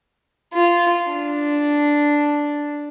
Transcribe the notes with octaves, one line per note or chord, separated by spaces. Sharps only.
F4
D4